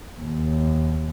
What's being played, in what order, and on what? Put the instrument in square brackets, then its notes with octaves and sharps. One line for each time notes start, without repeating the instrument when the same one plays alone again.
[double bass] D#2